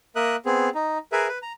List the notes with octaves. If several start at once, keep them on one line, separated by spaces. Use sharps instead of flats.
A#3 A#4 E5 D#6 F#6
B3 C4 G#4
D#4
G#4 A#4 B4 E5
B4
A#5